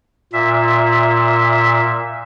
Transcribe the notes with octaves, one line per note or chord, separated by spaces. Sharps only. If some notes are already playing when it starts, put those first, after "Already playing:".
A#2 E5